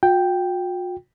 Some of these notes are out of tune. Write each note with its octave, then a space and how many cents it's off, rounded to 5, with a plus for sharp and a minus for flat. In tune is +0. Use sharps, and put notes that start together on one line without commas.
F#4 -45 G5 +0